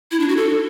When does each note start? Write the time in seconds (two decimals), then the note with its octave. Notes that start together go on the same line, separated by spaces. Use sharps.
0.11 E4
0.20 D4
0.29 F#4
0.37 A4